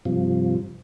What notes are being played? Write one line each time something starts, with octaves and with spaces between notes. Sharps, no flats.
G2 C3 F3